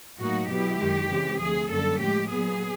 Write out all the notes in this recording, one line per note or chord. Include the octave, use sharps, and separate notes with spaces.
A2 F#3 A#3 D#4 F#4
B2 F#3 B3 E4 G4
F#2 D#3 G#3
C#3 E3 G#3 C4
D2 C3 F3 A3 G#4
F#2 D3 G3 A#3 C#4 A4
A2 F3 G#3 G4
A#2 F#3 B3 G#4